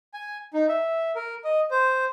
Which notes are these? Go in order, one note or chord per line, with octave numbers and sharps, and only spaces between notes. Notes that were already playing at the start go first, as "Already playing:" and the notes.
G#5
D#4
E5
A#4
D#5
C5